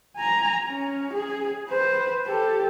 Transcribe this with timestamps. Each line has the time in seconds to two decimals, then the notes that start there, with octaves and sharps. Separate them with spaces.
0.17 G#5 A#5
0.67 C#4
1.14 G#4
1.69 B4 C5
2.27 G4 A4